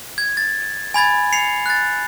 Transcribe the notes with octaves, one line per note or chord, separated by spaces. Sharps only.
G#6
A6
G#5 B5 G#6 A6
C7 C#7 F7
F#6 A6